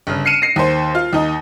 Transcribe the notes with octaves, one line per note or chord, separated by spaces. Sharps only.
G1 C#3
F6 C7 C#7 D#7 E7
A#6 C7
D#2 C5
F4
D#2 D#4